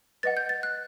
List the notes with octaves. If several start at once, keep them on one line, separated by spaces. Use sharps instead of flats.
B4 D#5 F#5 A6
G6
A6
F#6